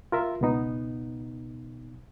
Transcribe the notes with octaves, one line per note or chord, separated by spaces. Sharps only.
F4 A#4 E5
C#2 B2 B3 D#4